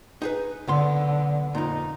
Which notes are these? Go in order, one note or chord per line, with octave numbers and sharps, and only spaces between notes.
D#4 G#4 B4
B1 D3 B3 C6
F2 A#2 D#4